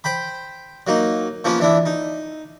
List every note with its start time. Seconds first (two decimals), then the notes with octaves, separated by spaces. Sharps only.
0.04 C5 G5 B5
0.87 F#3 A#3 D#4
1.44 F3 A#3 B3 C#4 F4
1.59 E3 D4 E4
1.86 D#4